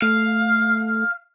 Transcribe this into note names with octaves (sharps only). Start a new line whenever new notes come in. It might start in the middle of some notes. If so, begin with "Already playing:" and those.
A3 F5